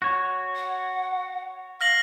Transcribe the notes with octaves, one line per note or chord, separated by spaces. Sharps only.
F#4 C#5
F#5
F5 F6 A#6 F#7